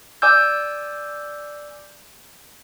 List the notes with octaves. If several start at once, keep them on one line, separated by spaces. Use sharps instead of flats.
D5 G#5 D6 E6 G6